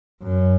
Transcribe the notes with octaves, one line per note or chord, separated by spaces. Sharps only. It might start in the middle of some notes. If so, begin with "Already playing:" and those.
F#2